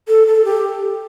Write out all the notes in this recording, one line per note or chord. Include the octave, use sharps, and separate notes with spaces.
A4
A4
G4